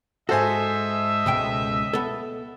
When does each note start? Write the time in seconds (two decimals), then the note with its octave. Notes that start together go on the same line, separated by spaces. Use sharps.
0.29 G#2 F#4 A4 C5 D#5 E5 G#5
1.26 C#2 B2 G5
1.93 B3 A4